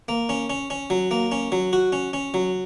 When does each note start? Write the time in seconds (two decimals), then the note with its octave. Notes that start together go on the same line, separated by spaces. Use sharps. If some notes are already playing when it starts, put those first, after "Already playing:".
0.08 A#3
0.29 C#4
0.50 C#4
0.70 C#4
0.90 F#3
1.11 A#3
1.32 C#4
1.52 F#3
1.73 F#4
1.92 C#4
2.13 C#4
2.34 F#3